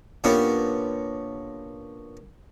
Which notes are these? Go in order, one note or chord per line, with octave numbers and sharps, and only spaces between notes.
A#2 B3 C#4 D4 G4